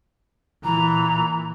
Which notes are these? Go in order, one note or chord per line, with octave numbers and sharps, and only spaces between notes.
A#2 E3 A#5